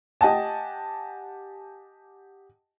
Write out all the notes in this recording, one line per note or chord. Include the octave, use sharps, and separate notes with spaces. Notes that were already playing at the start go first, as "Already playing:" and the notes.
G4 D#5 F#5 G#5 A5